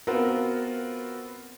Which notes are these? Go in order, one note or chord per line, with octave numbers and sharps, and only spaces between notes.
B3 C4 F4 F#4 A#4